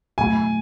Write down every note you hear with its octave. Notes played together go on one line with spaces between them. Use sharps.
B2 F#3 A3 G#5